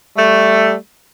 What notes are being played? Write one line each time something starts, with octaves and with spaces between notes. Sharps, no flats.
G3 A3